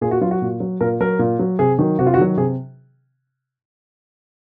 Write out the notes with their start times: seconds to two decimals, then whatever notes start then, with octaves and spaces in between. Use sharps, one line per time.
0.01 A#2 G#4
0.11 F#4
0.21 F#3 F4
0.31 F#4
0.42 A#2
0.60 F#3
0.81 A#2 A#4
1.00 F#3 A#4
1.19 A#2
1.39 F#3
1.59 C3 G#4
1.79 D#3 F#3
1.99 C3 F#4
2.06 F4
2.14 F#4
2.18 D#3 F#3
2.37 C3 G#4